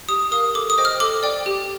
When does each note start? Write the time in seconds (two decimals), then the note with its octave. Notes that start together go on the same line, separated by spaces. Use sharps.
0.08 G4 D#6
0.31 A#4 F5 D#6
0.54 A4 D6
0.70 D#6
0.78 C5 D#5 G5
0.85 F6
1.00 A4 D6
1.23 D5 G5
1.46 G4